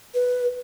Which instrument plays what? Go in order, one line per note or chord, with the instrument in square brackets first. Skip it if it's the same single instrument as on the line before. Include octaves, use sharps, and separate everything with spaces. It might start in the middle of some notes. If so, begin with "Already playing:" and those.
[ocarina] B4